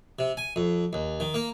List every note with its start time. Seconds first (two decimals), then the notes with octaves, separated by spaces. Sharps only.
0.19 C3
0.37 G#5
0.56 F2
0.93 D#2
1.20 D#3
1.34 A#3